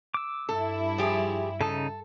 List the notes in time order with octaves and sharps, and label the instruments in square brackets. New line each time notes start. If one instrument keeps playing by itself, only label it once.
[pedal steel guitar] D6 E6
[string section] G2 E4 [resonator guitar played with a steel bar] A4
[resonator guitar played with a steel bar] F3 G4 G#4
[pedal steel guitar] C#3 D#4 D#6 [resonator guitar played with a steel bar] A4